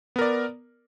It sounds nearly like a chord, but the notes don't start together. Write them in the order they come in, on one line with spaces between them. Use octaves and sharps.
B3 A#4 D5